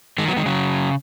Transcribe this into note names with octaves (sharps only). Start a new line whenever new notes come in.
D#3 G#3
F#3 B3
D#3 G#3
C#3 F#3